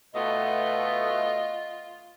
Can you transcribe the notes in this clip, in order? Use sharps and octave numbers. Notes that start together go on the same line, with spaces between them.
B2 A3 B3 F4 D#5